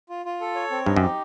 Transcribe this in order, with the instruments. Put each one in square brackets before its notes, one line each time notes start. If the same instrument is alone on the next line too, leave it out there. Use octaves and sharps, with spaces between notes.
[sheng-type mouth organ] F4
F4
A4
C#5
C4
[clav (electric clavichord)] G2 [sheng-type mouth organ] D#4
[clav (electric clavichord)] F#2
[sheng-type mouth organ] G4